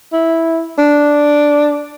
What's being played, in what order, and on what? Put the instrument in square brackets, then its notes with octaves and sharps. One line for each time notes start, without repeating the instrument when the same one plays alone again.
[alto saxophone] E4
D4